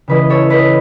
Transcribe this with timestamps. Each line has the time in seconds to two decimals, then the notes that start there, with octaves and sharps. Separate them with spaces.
0.08 C#3 E3 G#3 B4 D#5
0.30 A4 C#5
0.50 B4 D#5